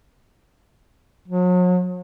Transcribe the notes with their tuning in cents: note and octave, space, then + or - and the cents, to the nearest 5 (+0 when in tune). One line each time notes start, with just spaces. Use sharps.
F#3 -40